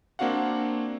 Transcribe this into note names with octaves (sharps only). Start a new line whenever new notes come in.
A#3 C4 D4 F#4 F5 F#5